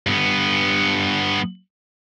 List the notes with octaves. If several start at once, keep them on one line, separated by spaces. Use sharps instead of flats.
G2 B3